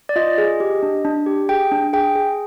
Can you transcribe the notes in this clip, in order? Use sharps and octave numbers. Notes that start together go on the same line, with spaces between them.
D5
F4 D#5
G#4
G4
D4
D4
G4
G#4 G5
D4
G#4 G5
G#4